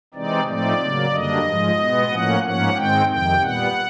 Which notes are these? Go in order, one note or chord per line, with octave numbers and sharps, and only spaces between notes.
C3 E3 G#3 C4 D#4 D5
A2 F3 A3 C4 D#4 D5
C#3 F#3 A#3
F#2 D3 G3 A#3 D4 D#5
G#2 F3 G#3
B2 G#3 B3
A2 F3 A#3 C#4 F#5
G#2 F3 A#3 C#4 F#5
G#2 D#3 G#3 C4 G5
F2 C3 D#3 G5
A#2 G3 B3 F#5